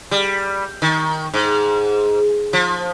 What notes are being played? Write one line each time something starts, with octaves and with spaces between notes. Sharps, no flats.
G3
D#3
G#2
F3